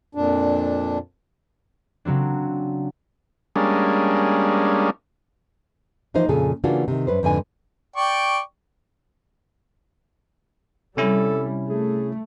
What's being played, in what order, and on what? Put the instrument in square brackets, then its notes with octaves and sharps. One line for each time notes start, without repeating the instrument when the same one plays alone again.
[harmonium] F2 A#2 D4
[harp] C#3 F#3 C4 D4
[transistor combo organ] G3 G#3 A#3 C#4 D4
[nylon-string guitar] E3 F3 A#3 D#4 C5
F2 A#2 C#3 G#4 A4
C#3 E3 A#3 D4 F4 F#4
C3 D#3
F#2 B4 C5
F2 G#2 D3 B4 G5 G#5
[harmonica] D5 G5 C#6
[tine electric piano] C3 C#4 E4 [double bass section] G3 [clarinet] A4
[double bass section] A3 [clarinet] G#4